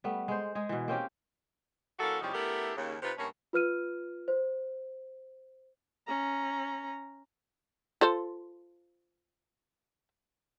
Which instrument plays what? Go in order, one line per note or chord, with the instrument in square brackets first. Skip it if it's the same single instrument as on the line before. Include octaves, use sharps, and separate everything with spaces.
[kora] G3 A3 B3
G#3 C5
G#3 G#4
B2 E3
A#3 C4 C#4 G4
[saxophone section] E3 A#3 C#4 F#4 A4
E2 C3 F3 G3 C#4 D#4
A3 B3 D4 E4 G4 A#4
D#2 C#3
C3 D#4 F4 B4
G2 A3 A#3 C#4
[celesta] F4 B4 F6 D#7
C5
[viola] C#4 A#5
[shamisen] F4 A4 C5